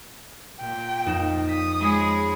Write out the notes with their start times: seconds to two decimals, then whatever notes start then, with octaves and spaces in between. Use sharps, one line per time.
0.60 A#2 G5
1.06 F2 D#4 E7
1.49 D#6 B6
1.80 G#3 G#4 C#5 B5